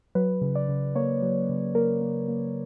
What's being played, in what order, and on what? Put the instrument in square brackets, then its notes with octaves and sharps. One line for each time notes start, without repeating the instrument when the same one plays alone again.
[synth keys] F#3 B4
C#3
D5
C#3
A#3 C#5
F#3
C#3
A#3 A#4
A#3
A#3